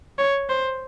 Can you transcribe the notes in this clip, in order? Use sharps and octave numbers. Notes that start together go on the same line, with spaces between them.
C#5
C5